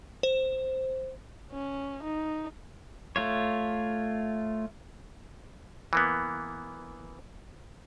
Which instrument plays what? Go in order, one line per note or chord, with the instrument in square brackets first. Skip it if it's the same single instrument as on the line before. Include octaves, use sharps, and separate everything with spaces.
[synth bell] C5
[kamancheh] C#4
D#4
[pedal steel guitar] A3 F4 C#5
[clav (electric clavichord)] E3 A#3 B3